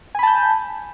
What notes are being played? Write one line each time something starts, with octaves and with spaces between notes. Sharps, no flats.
G#5 A5 B5 G6